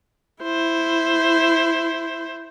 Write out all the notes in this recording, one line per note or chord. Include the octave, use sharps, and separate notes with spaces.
E4 C5